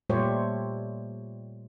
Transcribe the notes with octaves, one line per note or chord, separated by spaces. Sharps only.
A#2 G3 A3 G4 C5 C#5